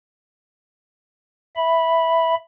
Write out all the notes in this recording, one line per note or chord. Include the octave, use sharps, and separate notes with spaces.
E5 B5